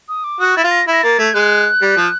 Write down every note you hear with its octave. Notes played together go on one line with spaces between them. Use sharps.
D#6
D6
F#4 D#6
E4 A6
F4
A#6
E4
A#6
A#3 A6
A3 G#6
G#3 F#6
G3
F3